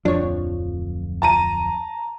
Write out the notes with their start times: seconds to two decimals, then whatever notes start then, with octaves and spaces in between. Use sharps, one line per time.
0.05 D1 F2 F3 D4 C#5
1.22 A5 A#5 D#7